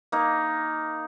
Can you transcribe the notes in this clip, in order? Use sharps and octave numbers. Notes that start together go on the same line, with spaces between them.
A#3 D#4